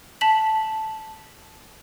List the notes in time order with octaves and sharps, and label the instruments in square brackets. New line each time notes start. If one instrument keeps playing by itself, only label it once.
[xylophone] A5 B6 F#7